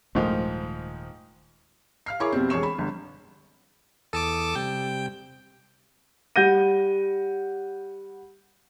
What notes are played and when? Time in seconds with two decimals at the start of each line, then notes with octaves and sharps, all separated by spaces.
0.15 D#1 G#2 D#3 F3 A3
2.06 F5 F6 C7
2.20 E4 G#4 A#4 C#5 C#6 D6
2.32 F2 B2 G3 C4
2.50 E1 G#4 C#5 C#6 E7
2.63 B5
2.78 G1
4.13 E2 A4 A5 D6 D#6
4.56 C3 G3 G5
6.36 G3 F#5 G6 A#6 D#7